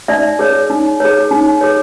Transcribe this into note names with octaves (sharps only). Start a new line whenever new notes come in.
D#4 D5 E5
G#4 C#5
D#4
G#4 C#5
D#4
G#4 C#5